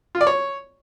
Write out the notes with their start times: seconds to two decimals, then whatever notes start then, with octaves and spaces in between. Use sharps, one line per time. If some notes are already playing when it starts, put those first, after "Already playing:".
0.15 F4
0.21 D5
0.27 C#5